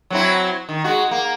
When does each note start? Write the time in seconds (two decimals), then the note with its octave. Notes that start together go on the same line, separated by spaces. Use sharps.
0.10 F#3 C4 E4
0.69 D#3
0.84 G#3 F#4
1.11 A#3